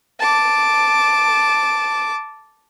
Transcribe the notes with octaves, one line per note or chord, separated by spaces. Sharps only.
A5 D6